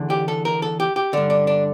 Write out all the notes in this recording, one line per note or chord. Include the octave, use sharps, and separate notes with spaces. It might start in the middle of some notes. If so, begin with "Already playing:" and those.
Already playing: E2 D3
G4
A4
A#4
A4
G4
G4
G2 D3 D4
D4
D4